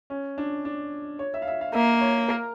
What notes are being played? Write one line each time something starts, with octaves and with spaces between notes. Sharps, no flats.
C#4
D4
D4
C#5
E5
F5
E5
F5
A#3 E5
C#5
A#4